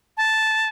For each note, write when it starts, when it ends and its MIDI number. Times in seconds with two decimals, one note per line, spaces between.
0.17 0.69 81